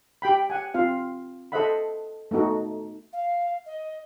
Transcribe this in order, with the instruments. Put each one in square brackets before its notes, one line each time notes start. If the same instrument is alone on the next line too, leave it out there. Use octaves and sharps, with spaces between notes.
[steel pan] G4 G5 B5
F#5 G#5
C4 F4 F5
A4 C5 D#5 E5 F#5 B5
A3 B3 D#4 F#4 A4
[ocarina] F5
D#5